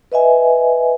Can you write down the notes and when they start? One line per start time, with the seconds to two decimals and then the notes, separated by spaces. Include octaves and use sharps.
0.12 B4 D#5 E5 G#5